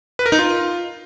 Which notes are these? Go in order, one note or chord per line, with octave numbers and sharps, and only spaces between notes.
B4
A#4
D#4
F4